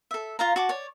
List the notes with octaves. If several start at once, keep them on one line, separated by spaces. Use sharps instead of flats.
A4 E5
F4 F5 A#5
F#4 A5 D6
C#5 D5